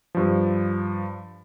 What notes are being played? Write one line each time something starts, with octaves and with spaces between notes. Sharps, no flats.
G2 F3